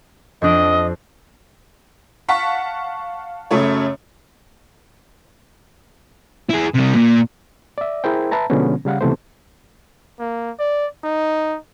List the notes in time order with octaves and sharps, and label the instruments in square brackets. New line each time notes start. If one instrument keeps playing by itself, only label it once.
[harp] F2 D4 D6 [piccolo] D#5
[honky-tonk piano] F5 F#5 A5 C#6 B6
F#2 C#3 A3 C#5
[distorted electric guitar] E4 G#4
C3 G3
A#2
[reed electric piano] D5 E5
E4 G#4 A#4 C5 G5
B4 E5 A5 A#5
B2 D3 F3 G#3 B3 C#4
C#3 G3 F5 F#5
C#2 C3 E3 A3 B3 C5
[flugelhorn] A#3
D5
D#4